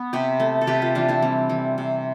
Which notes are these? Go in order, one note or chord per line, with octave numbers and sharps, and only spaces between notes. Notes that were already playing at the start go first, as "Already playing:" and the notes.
Already playing: B3
C3 G4 B4
A3
A4
C3 G4 B4
F4 A4
E3 D4 F4
C4 E4
G3 C4
E3
C3